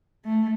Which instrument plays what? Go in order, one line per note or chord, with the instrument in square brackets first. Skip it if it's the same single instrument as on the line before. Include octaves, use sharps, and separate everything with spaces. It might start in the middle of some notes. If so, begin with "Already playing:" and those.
[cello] A3